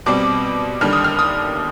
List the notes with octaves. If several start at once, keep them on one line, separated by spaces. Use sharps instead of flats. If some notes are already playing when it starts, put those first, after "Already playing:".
B2 G3 C4 D6
D#2 D3 G3 F6
D#6
F6
D#6